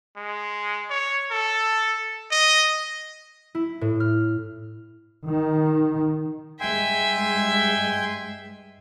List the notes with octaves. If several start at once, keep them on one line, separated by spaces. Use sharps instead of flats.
G#3
C#5
A4
D#5
E4
A2
F6
D#3
G2 G#3 E5 G5 G#5 C6